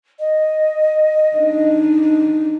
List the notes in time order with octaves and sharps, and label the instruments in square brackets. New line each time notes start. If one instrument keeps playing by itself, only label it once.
[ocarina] D#5
[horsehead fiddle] D4 D#4